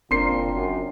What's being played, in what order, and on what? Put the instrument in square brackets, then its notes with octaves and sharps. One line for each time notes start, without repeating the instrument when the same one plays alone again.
[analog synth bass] F#1 [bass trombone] A#2 [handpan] C4 D4 A#4 [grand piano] C6 C7
[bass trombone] F#2